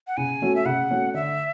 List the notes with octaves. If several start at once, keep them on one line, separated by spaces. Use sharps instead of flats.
F#5
C#3 G#5
F#3 A3 C#4 F#4
E5
C#3 F#5
F#3 A3 C#4 F#4
D3 E5